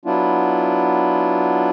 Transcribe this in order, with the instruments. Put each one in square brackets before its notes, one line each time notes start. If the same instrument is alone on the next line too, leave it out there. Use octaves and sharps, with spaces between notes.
[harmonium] F#3 B3 D4 E4 F4